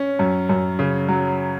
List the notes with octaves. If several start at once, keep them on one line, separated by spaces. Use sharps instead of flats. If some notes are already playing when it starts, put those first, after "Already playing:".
Already playing: C#4
F#2
F#2
C#3
F#3